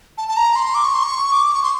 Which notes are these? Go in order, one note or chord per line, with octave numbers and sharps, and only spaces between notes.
A5
A5
A#5
C6
D6
C#6
C6
C#6
D6
C#6
C6